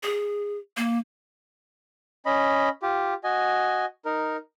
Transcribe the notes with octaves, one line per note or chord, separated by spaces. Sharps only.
G#4
A#3
C#4 D#5 B5
F4 G4
F#4 D#5 G#5
D#4 A#4